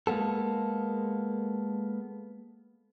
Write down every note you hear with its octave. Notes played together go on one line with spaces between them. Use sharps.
G#3 A#3 B3 A4